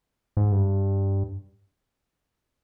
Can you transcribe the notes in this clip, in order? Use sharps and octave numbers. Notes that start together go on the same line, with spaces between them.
G#2
G2